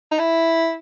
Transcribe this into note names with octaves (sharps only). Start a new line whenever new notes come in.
D#4
E4